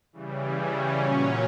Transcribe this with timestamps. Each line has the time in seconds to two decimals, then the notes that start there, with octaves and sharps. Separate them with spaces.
0.13 C#3 E3 G3
0.57 C#4
1.01 A#2 F#3